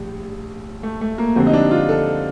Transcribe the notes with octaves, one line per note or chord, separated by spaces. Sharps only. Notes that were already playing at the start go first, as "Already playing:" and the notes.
Already playing: A#1 A2 G3
A3
A3
A#3
F2 D3 G3 C4
D#4
D4
F4
A4